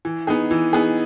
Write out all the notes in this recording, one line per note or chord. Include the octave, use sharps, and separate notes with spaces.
E3
B3 D#4 G#4
E3
B3 D#4 G#4